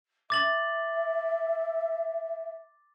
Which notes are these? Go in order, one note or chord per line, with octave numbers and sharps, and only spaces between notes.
E5 D6 A6 F#7